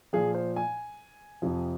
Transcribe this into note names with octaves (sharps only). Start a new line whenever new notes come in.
A#2 F3 G#4
C5
G#5
F2 C3 F3